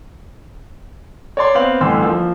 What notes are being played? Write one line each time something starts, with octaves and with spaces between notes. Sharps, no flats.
C#5 D5 C6
B3 C4 F5 F#7
A1 D2 G2 C6 E6
F3 A#3